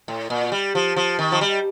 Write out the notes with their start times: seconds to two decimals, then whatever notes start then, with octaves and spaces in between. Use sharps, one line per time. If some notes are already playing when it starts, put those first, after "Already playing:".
0.08 A2
0.30 A#2
0.52 G3
0.75 F3
0.96 F3
1.19 D#3
1.32 F3
1.41 G3